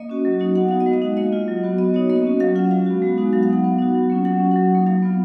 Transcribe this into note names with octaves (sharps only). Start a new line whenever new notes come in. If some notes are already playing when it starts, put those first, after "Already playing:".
Already playing: A#3 D#5
C#4 F#4
F#3
A#3 D#4 F#4
B3 F#5
D#4 F#4 F5
D#5
G#3
F5
D#4 F#4
A#3 D#5
F4
F#3
B3 F#4
B3 D#5
D#4 F#4 C#5
A#3 D#5
C#4 F#4
F#3 F5
C#4 F4 F#5
G#3 F5
B3 F#4
G#3
B3 D#4 F#4
F#3 F5
F5
B3 D#4 F#5
B3
D#4 F#4
F#3
A#3 C#4 F4
F#3 F#5
C#4 F#4
F#3 F#5
A#3 D#4
F#3 F5
B3 F4